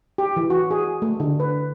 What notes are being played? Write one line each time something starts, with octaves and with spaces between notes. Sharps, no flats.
G4
E3
F#4
G#4
A3
D3
B4